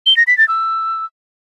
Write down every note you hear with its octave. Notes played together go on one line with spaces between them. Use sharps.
G7
A#6
B6
A6
E6